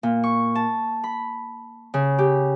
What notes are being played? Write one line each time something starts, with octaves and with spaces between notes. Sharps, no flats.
A#2
C#6
A5
B5
C#3
G4